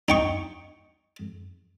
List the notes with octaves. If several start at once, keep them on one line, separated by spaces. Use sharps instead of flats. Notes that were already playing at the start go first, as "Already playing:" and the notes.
D#4 G5 C#6